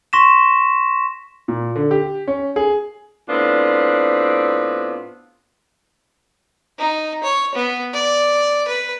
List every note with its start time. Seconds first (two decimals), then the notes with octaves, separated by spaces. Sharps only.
0.13 C6 C#6 A#6 B6 E7
1.48 A#2
1.76 D3
1.91 G4
2.28 C#4
2.56 G#4
3.28 A2 B3 C4 D4 F4
6.78 D#4
7.23 C#5
7.55 B3
7.94 D5
8.68 B4